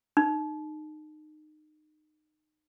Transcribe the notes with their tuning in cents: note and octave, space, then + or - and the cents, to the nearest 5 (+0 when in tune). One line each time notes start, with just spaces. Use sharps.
D#4 -25